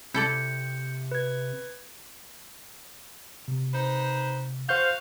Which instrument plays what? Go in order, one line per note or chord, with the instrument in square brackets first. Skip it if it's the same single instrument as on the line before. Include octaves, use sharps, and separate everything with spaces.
[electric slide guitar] C3 [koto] E4 A4 D5 [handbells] G6 C#7
[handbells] B4 G#6
[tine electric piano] C3
[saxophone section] D#4 B4 C5
[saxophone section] F#4 F5 [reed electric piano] C5 G6